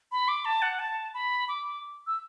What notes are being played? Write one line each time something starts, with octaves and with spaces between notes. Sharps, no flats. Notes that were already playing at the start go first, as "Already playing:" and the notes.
B5
D6
A5
F#5
A5
B5
D6
E6